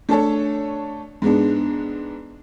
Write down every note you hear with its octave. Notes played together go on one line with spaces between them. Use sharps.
A3 D4 A4 C#5
G#2 G#3 B3 D4